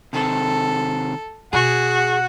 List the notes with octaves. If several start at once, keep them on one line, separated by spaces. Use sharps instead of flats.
C3 D#3 C4 A4
B2 F#4 G#4 F#5